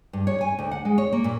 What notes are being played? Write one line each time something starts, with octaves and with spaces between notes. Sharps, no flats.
G2
C#5
G#5
D2
F#5
G#3
C#5
A#3
A#2